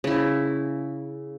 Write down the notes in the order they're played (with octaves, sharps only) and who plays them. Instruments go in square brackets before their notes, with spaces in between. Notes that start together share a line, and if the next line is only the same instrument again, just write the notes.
[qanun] C#3 E4